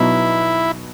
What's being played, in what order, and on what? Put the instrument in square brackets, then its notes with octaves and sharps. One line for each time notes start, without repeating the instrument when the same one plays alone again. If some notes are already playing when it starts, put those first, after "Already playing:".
Already playing: [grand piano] B2 F#3 B3 D#4 [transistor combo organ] E4